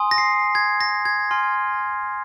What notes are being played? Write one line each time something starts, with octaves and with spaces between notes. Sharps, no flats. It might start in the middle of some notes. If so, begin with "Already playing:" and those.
Already playing: G#5 C6 D#6
A#6
C7
G#6
A#6
G#6
G#5 C6 F6